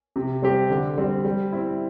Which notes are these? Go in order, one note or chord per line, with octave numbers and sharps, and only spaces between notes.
C3
G3 C4 G4
D3
G3 C4
G3
C4 E4